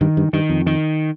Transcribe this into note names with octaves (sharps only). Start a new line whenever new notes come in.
G2 D#3
G2
G2 D#3
F2
D#3